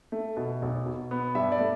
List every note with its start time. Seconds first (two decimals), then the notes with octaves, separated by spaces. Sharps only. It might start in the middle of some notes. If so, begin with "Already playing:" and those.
0.12 A3
0.37 B2
0.62 B1
0.86 B2
1.11 B3
1.35 G2 E5
1.52 D5
1.60 A3